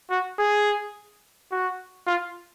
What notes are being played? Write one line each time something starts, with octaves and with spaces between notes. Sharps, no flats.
F#4
G#4
F#4
F4